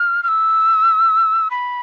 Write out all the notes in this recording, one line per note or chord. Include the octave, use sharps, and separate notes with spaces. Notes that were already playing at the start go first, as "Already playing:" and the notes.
Already playing: F6
F6
E6
B5